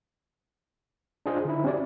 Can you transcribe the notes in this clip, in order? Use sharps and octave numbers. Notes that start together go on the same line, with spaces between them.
D4 F4 G#4 C5 D#5
D3 D#4 E4
C4 C#4 F#4 G4 C#5 D5